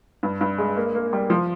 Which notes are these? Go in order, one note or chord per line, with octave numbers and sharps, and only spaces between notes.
G2
G2
G#3
A#3
A#3
G3
F3